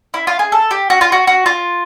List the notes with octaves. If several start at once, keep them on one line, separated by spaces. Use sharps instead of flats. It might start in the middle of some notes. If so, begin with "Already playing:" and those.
E4
F4
G#4
A4
G4
F#4
F4
F#4
F#4
F4